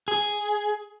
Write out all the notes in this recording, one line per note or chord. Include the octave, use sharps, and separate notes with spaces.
G#4